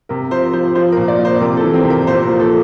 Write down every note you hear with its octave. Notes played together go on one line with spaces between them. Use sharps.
C3 A#4
F3 C5
F3 C5
F3 C5
A#2 A#4
D5
F3
C5
C3 A#4
A4
E3
C4
C3
A#4
A#2 C5
A#4
F3
A4